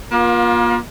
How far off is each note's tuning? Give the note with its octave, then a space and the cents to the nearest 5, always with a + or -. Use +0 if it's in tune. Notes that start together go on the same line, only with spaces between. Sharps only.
A#3 +40 F4 +15